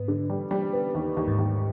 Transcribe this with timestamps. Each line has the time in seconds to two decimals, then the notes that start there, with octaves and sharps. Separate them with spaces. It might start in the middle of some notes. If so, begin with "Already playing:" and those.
Already playing: G#2 B3
0.08 D3
0.30 G3
0.51 G3
0.73 B3
0.95 D#2
1.17 D#2
1.28 G#2
1.38 D#2